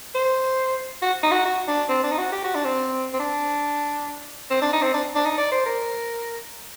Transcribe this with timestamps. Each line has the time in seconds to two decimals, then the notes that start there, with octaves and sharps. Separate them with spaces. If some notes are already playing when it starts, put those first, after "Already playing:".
0.15 C5
1.02 F#4
1.23 D#4
1.32 F#4
1.45 F#4
1.68 D4
1.89 C4
2.03 D4
2.12 D#4
2.18 F#4
2.32 G4
2.44 F#4
2.55 D4
2.65 C4
3.14 C4
3.20 D4
4.50 C4
4.62 D4
4.73 D#4
4.82 C4
4.94 D4
5.15 D4
5.26 D#4
5.38 D5
5.52 C5
5.66 A#4